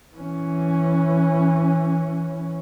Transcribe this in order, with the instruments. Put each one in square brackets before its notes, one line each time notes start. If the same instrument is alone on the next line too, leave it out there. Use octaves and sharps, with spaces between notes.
[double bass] E3 C#4